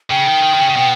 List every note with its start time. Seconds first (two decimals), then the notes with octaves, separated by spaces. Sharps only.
0.10 C#3 G5
0.27 D#3
0.43 D#3
0.54 D#3
0.59 C#3
0.69 C#3
0.76 B2